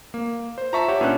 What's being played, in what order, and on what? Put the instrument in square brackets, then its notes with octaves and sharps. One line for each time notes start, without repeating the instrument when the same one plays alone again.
[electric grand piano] A#3
C5
[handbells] F4 E5 A5 [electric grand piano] A#5 C#6
[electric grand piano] G4 C#5 F#5
[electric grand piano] A#2 C#4 F#6 [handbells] D4 B4 C#5